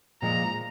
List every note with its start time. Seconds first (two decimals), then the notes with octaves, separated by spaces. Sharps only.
0.22 A#2 F3 G#3 A#5